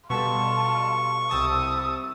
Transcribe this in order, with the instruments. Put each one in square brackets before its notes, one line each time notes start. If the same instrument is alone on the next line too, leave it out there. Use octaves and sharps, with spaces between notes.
[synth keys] B2 G3 A4 [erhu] F4 [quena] A5 [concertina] C#6
[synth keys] C2 C3 A5 [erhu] D#6 [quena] E6